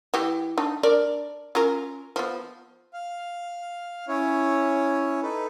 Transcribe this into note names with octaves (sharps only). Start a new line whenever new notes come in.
E3 G4
D4 D#4
D4 A#4 D5
C#4 F4 A#4
F3 B3
F5
C#4 E4 C#5
D#4 A4 B4